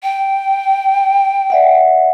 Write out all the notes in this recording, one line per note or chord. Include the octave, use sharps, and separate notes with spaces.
G5
D5 E5 F#5